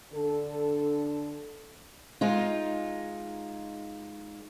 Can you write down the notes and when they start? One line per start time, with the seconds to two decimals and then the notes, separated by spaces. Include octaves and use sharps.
0.13 D3 D4 A4
2.21 G#3 D#4 F4